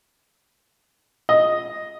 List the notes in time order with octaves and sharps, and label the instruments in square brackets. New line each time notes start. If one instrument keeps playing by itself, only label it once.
[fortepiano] D#5